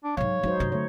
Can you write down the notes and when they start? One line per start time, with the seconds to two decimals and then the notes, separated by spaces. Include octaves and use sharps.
0.04 D4
0.17 G#2 F#3 C#5 F5
0.43 F#3 G#3 D#4 C5
0.60 G2 C3 C#4
0.72 D3 F#3 A3 C#5